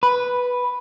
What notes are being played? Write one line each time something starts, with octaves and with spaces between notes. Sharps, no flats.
B4